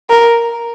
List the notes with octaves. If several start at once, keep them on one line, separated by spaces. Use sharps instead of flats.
A#4